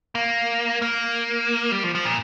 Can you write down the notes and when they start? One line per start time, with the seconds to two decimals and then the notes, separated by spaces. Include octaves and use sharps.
0.15 A#3
0.82 A#3
1.72 G3
1.84 F3
1.95 F3
2.05 A#2